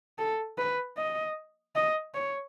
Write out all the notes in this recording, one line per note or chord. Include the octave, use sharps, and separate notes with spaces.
A4
B4
D#5
D#5
C#5